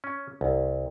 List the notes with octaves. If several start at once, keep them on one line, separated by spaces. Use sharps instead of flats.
C#4
C2